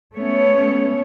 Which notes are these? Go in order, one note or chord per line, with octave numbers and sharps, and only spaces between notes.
A3 B3 C#4 C#5